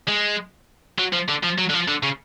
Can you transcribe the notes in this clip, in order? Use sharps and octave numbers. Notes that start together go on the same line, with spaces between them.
G#3
F#3
F3
D3
F3
F#3
D3
F3
D3
C#3